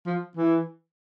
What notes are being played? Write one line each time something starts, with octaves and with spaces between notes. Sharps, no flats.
F3
E3